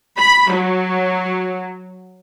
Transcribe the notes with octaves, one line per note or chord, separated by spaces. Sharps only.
B5
F#3